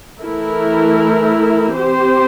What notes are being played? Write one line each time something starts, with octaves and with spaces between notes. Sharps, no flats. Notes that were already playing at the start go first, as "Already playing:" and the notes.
E3 A3 E4 A#4
C4 G4 C5